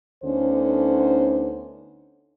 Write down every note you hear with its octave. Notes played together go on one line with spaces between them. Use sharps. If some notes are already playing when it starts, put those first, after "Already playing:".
D2 D3 B3 C#4 D#4 C5